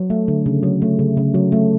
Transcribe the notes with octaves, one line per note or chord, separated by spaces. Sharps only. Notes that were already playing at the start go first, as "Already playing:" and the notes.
Already playing: F#3
A3
D3
C#3
F#3
A3
C#3
C#3
F#3
A3